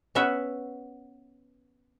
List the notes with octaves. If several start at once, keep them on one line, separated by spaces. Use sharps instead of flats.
B3 C#4 B4 E5 F#5